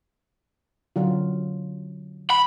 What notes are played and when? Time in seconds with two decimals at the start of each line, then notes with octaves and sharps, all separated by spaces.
0.96 D3 F#3 F4
2.30 B5